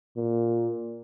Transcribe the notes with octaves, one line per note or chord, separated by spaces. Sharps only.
A#2